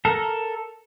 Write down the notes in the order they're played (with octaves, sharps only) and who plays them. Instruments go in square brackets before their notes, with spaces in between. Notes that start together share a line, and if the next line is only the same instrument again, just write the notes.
[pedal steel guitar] A4 A#4